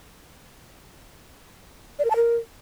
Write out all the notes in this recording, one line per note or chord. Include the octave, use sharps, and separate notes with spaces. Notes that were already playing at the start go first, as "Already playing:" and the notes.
D5
A#4
A5
A#4